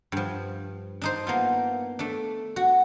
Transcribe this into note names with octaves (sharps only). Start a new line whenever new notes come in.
G2 F3
D4 D#4 C5
A#3 B3 F4
A3 D4
F#4